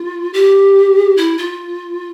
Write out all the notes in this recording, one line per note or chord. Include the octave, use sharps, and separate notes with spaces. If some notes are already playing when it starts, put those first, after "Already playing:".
Already playing: F4
G4
E4
F4